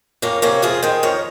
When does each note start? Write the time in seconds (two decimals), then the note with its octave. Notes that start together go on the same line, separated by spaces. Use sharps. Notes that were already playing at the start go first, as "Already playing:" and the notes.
0.22 F2 A#3 C#4
0.42 C3 A#3 C#4
0.62 F2 F4 G#4
0.83 D#3 G#4 C5
1.03 F2 A#4 C#5